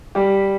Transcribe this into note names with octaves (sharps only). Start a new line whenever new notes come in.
G3 G4